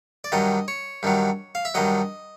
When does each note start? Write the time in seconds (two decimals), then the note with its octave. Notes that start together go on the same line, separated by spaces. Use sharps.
0.24 D5
0.32 G2 D#3 F#3 D#5
0.68 C#5
1.03 G2 D#3 F#3
1.55 F5
1.65 E5
1.74 G2 D#3 F#3 D#5